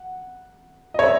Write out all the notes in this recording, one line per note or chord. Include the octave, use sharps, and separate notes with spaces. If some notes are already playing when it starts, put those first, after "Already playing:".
Already playing: F#5
D#5
C#5 E5